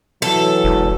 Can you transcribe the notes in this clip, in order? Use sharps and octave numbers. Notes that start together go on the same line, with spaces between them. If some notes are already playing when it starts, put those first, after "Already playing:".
E3 F#3 A4
E1